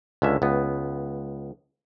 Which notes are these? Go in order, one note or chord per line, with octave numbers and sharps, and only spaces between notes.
C#2 D3 C#4 E5
C#2 B3